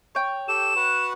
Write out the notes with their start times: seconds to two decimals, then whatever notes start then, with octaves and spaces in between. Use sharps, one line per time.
0.15 C#5 G5
0.48 G4 A4 E7
0.76 F#4 B4 F#5